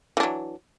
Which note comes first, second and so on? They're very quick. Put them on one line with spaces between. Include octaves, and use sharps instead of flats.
E3 D4 F#3